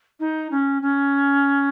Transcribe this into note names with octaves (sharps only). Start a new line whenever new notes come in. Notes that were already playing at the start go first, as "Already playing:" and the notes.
D#4
C#4
C#4